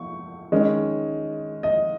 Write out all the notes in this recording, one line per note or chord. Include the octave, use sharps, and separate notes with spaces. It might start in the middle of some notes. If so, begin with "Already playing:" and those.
Already playing: C#6
D#3 G#3 C#4
D#5